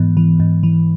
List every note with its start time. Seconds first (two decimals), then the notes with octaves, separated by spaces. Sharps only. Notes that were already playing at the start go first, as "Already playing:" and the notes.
Already playing: G#2 E3 B3
0.17 E3
0.40 G#2
0.63 E3